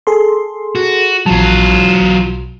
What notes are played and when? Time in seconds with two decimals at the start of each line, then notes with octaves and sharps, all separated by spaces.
0.07 G#4 A4 C6
0.75 F#4
1.26 A#1 F#3 F4 A5
2.01 B1